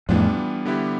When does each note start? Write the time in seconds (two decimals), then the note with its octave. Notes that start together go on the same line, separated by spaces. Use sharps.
0.09 F2 A2 E3 G3 B3 D4 F4
0.65 D3 G3 B3 E4 G4